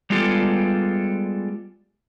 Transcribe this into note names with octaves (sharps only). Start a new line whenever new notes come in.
G3 G#3 B3 F4 G4 A4